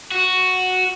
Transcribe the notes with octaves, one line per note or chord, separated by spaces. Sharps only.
F#4